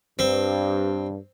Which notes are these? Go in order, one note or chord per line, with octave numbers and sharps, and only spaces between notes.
G2 C4